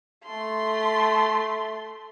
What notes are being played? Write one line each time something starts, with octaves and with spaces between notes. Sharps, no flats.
A3 C6